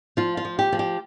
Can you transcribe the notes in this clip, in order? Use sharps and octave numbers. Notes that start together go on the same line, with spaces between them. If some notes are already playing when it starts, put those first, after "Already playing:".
F3 F4
F4
F3
G4
F3
G4